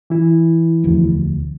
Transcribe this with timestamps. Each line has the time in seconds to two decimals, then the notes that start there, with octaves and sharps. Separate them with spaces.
0.10 E3 E4
0.84 E1 D2 F3